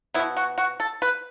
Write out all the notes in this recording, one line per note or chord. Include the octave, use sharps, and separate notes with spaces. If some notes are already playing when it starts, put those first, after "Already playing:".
B2 B3 E4
F#4
F#4
A4
B4